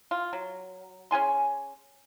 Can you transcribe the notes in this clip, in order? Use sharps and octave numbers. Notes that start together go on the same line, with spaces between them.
F4
F#3
C#4 G#4 G#5 C6